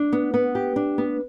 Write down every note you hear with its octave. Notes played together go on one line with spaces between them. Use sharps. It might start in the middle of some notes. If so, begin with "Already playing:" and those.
Already playing: D4
B3
B3
G4
D4
B3